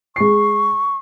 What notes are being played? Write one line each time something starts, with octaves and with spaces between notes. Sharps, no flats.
G#3 C#6 C7